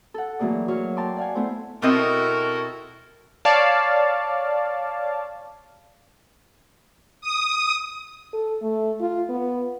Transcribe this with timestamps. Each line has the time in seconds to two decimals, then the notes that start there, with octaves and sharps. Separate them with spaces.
0.14 A4 F#5
0.39 E3 F#3 A3 A#3 G#4 D5
0.68 F#3 C#5 C#6 F6
0.97 G5 A5 A#5 C6 D6
1.17 D5 F5 F#5 G#5
1.35 A3 B3 E4 C5
1.82 B2 C4 E4 F#4 A4 A#4 D#5
3.45 C#5 D5 F5 A5
7.21 D#6
8.33 A4
8.62 A3
9.01 F4
9.29 B3